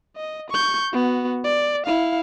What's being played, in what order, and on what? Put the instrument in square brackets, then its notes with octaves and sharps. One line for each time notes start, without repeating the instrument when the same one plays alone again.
[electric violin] D#5
C#6 G6
B3 F#4
D5
E4 F5